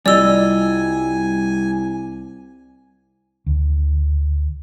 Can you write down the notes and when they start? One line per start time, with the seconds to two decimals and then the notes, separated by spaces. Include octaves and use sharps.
0.06 C2 G3 F4 D5 D#5 G#5 E6
3.46 D2